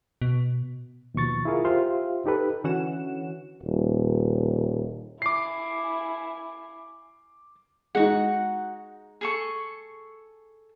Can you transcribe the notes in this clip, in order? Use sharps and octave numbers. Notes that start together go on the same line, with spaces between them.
B2
D#2 B2 F3 C#6 A6
E4 F4 G#4 A#4 F5
F4 G4 C5 E5 F5 C6
D#4 G4 A4 B4
D3 E3 C#4 F#4 F#5 E7
D#1
E4 G#5 D6 C7
G#3 D#4 F#4 F#5
G#4 A4 C#6